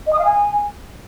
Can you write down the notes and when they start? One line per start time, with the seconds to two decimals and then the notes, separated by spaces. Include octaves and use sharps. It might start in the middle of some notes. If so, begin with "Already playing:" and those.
0.07 D#5
0.13 D#6
0.19 F5
0.25 G#5